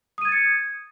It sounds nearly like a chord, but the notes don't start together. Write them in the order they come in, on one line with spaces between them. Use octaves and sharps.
D#6 D#7 G#6 A6 C#7